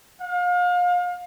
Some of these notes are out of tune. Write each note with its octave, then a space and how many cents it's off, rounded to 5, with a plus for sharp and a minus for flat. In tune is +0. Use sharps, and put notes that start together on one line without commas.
F5 +35